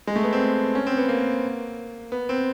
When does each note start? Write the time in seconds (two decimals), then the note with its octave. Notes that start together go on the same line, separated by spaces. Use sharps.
0.07 G#3
0.16 A3
0.24 B3
0.33 C4
0.75 C#4
0.87 C4
0.98 B3
1.09 A#3
2.12 B3
2.29 C4